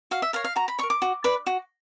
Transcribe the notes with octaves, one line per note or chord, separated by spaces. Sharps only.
F#4 F5
E5
A#4 C#5 F5
F5
F#4 A#5
B5
C#5 C#6
A#4
D6
F#4
B4 D5
F#4